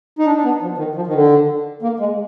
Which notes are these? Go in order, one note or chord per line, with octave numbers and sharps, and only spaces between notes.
D#4
D4
D4
B3
F3
D#3
F3
D#3
D3
A#3
G#3